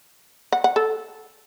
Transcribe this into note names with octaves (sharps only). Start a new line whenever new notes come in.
F#5
F#5
A4